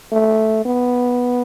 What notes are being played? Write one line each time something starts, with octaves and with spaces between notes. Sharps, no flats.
A3
B3